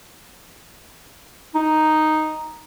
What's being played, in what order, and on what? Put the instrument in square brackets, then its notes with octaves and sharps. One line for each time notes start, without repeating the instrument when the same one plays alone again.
[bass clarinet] D#4